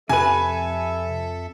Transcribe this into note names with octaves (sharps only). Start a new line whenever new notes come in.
F2 C3 A4 B4 E5 G#5